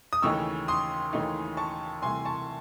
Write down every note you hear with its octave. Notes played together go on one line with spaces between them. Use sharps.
D#6
D#2 C#3 E3 A3 D#4 C#6 E6
C6 D#6
D#2 C#3 E3 A3 D#4
A5 C#6
C2 C3 E3 A3 G#5 C6
A5 C#6